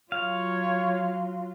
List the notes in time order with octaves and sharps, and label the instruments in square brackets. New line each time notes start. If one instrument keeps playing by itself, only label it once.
[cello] F#3 F4 [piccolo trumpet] C#5 [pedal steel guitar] F5